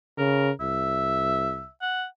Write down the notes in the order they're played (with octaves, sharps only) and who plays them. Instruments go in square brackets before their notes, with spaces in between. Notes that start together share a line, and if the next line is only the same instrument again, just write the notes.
[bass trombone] C#3 [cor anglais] A#4
[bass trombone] C2 [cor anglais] E5
[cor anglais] F#5